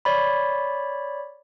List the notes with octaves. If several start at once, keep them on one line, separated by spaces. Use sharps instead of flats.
C#5 D5 B5